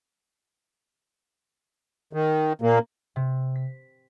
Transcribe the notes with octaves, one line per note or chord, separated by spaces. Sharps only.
D#3
A#2 A#3
C3
B6